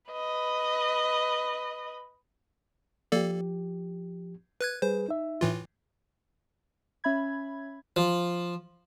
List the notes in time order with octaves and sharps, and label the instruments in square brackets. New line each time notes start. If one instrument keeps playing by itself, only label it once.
[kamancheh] B4 D#5
[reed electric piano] F3 G4 [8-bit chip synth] A#3 A4 D5
[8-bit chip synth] B4 F#6 G#6
[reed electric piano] G3 G#4 B4 [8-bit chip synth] C5
[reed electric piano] D#4 E5
[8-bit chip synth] A2 E3 F4
[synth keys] C#4 E5 B5 G#6
[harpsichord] F3